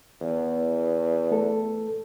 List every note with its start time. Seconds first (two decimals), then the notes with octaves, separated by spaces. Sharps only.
0.21 E2
1.31 A3 A4